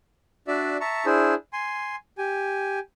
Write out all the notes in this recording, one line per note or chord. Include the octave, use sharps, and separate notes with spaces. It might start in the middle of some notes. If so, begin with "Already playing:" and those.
D4 F#4 D5 E5
E5 A5 A#5 C#6
D4 E4 G#4 C5
G#5 C6
G4 G#5